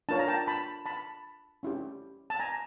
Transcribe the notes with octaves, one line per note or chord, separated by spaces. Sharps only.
D4 F4 A#4 C#5 A5
A#5
G5 A5
A5 B5
A5 B5
C#4 E4 G4
A5
G#5 A#5